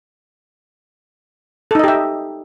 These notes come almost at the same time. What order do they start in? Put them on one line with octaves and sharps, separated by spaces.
A4 D#4 D#5 G4 E5